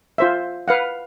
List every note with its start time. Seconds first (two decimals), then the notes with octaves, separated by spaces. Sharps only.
0.18 F4 C5 E5
0.68 B4 F5 F#5